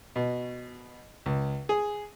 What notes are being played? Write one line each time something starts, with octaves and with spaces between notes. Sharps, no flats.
B2
C#2
G#4